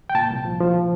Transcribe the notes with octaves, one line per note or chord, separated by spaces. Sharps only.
G5
A#2 A5
C2
F3
F3